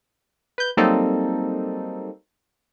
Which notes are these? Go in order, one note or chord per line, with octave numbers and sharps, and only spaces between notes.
B4 G6
F#3 G3 A#3 C4 D#4 A4